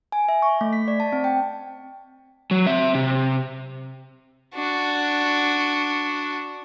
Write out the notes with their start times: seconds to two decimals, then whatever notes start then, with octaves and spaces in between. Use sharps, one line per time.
0.12 G#5
0.28 E5
0.42 C#6
0.61 A3
0.73 B6
0.88 D5
1.00 A5
1.12 C4
1.24 G5
2.51 F#3
2.67 C4 E5
2.95 C3
4.55 D4 F#4